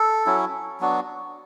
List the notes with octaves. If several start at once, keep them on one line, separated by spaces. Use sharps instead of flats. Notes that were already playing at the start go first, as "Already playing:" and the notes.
Already playing: A4
F#3 C#4 E4
F#3 B3 D4 F#4